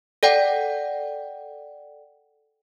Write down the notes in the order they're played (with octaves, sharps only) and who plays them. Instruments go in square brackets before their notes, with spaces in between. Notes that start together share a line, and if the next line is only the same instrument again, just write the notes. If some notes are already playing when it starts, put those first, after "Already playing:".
[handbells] A4 D5 F#5 G5